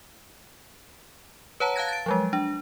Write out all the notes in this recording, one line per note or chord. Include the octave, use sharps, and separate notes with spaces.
B4 C#5 F#5 A5 A#5
F5 A5 F#6 G#6 A#6
A6 D7
F3 F#3 G#3
D4